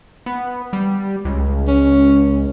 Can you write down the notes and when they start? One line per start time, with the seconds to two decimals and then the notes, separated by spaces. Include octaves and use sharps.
0.26 B3
0.73 G3
1.25 C#2
1.68 C#4